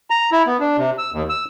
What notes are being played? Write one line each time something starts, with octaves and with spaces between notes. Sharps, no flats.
A#5
E4
B3
D4
C3
E6
D#2
E6